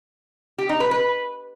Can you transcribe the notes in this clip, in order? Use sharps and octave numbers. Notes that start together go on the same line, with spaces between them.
G4
D#4
B4
B4